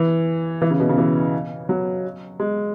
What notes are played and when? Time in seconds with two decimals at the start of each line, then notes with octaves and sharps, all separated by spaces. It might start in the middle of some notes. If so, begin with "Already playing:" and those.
Already playing: E3
0.62 E3
0.71 C#3
0.80 B2
0.89 C#3
0.98 E3
1.69 F#3
2.40 G#3